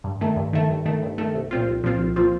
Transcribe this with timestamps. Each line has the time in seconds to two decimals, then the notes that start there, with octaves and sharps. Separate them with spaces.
0.04 G2
0.21 D#3 A3
0.36 G2
0.53 D#3 A3
0.70 G2
0.86 D#3 A3
1.02 G2
1.18 D#3 A3
1.35 C2
1.51 A#2 F3 C4 F4
1.68 C2
1.84 A#2 F3 C4 F4
1.99 C2
2.16 A#2 F3 C4 F4